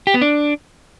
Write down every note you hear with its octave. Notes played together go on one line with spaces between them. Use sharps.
G4
B3
D4